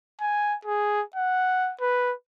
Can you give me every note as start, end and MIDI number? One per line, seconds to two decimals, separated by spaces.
0.20 0.55 80
0.65 1.02 68
1.16 1.72 78
1.81 2.13 71